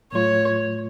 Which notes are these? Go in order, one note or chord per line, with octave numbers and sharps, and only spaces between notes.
A2 F#3 A3 F4 C#5